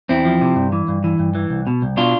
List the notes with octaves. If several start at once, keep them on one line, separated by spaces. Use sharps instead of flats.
E2 C4 E4
F3
C3
G2
E3
G2
E3
G2
E3
C2
B2
C2
B2 D4 F4